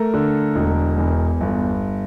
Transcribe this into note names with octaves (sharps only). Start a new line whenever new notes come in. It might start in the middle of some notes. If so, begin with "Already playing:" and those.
Already playing: A3 A#4
D3
E1
E2
G1